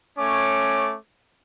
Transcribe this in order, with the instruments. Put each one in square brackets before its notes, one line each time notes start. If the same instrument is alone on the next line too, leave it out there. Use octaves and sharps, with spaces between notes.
[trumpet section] A3 C#4 C#5 D6